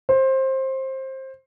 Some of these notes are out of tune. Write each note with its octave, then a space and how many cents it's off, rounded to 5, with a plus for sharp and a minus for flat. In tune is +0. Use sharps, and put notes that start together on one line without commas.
C5 +20